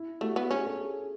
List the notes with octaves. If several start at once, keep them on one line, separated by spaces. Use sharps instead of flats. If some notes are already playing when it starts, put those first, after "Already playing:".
Already playing: E4
A3 F#4
B3
C#4 G#4
A4
G#4